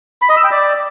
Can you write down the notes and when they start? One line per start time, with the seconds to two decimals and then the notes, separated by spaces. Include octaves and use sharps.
0.22 B5
0.29 D#5
0.37 E6
0.44 G5
0.51 D5